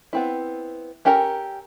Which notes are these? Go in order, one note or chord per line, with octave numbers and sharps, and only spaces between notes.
B3 C4 E4
C#4 G4 A4 A#4 A#5